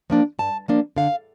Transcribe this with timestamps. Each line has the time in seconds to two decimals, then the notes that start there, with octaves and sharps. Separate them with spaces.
0.10 F3 A#3 D4
0.39 G2 A5
0.68 F3 A#3 D4
0.96 D3 F5